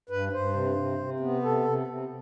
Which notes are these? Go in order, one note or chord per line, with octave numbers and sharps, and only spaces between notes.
G2 B4
G2 C5
C3
C3
C3
B3
C3 A4
C3
C3